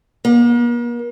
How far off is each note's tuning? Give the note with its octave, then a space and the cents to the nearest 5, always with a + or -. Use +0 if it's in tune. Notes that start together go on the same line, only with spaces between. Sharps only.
A#3 +40